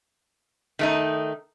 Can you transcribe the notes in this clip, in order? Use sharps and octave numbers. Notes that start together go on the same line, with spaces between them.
D#3 A3 D#4